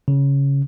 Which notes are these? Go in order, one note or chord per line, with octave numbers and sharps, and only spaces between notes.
C#3